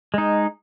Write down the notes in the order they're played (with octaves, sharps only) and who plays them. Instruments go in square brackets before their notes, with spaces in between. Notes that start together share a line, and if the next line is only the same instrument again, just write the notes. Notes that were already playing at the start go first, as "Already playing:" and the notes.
[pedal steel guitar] G#3 D#4